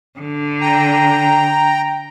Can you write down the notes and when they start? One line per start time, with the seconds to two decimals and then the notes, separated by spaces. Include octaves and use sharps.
0.20 D3
0.61 G5 A#5